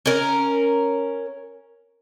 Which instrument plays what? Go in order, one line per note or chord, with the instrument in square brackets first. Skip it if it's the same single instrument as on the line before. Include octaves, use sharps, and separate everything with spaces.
[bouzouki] C#4 A#4